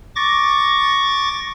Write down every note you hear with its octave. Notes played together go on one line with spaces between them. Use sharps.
C#6 D6 A6 A#6